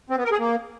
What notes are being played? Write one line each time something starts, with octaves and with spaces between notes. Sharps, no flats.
C4
B3
A#4
G#4
A#3